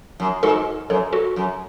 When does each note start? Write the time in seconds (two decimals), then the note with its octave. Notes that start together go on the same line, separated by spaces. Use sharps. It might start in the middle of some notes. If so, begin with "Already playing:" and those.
0.20 F#2
0.43 G#2 F#4 A4
0.90 F#2 A4 C#5
1.13 F#4 A4
1.36 F#2